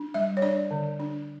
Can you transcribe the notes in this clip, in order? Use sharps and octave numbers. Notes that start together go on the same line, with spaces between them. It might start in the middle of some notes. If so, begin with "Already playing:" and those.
Already playing: D4
G3 E5
C#5
D4 D5
D3
D4